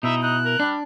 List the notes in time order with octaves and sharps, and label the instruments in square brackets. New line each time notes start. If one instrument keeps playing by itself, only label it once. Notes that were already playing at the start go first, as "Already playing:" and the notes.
[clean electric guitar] B2 E4 [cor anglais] D#4 [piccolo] E5
[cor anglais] D#4 [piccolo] F#6
[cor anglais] A#4
[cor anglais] G3 [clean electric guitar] D4